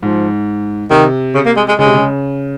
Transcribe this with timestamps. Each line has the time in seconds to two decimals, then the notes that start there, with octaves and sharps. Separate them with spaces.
0.02 G#2 F3
0.91 C3 D#3
1.35 C#3
1.46 A#3
1.57 G#3
1.68 G#3
1.79 C#3 G#3
1.86 C3
1.94 C#3